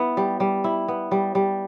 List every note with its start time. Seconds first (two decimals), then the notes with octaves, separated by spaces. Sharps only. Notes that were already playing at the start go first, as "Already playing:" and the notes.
Already playing: B3 E4
0.17 G3
0.40 G3
0.64 E4
0.88 B3
1.11 G3
1.35 G3